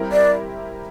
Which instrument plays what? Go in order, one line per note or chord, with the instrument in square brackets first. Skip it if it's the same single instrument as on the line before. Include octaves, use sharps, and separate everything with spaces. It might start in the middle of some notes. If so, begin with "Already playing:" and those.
Already playing: [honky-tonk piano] G3 C4 E4 G4 A#4
[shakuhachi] D5